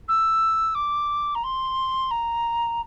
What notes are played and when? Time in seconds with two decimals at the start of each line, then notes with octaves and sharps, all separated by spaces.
0.08 E6
0.74 D6
1.35 A#5
1.43 C6
2.10 A#5